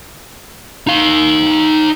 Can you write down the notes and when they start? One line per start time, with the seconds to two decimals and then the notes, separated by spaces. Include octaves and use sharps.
0.87 D#4 F5